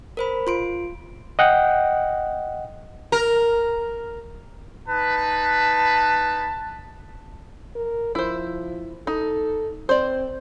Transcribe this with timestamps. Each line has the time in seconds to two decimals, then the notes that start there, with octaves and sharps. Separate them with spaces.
0.17 A#4 C5 B5
0.47 F4 C6 D7
1.39 D#5 F#5 G5
3.12 A#4
4.88 D#4 B4 A5
7.75 A#4
8.15 F3 E4 C5
9.07 D#4 A4
9.89 C4 C5 D5